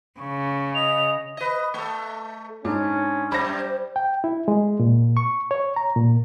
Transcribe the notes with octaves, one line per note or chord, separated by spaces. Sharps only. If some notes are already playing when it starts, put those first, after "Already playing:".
C#3 C#6
D#5 F7
B4 D#5
A3 A4
G#2 C#4 D4
F#2 G3 C#4 C5 B5 A#6
G5
E4
G#3
A#2
C#6
C#5
A#5
A#2